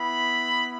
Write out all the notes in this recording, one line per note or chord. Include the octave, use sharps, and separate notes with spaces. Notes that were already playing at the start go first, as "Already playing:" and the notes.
Already playing: B3 E4 B5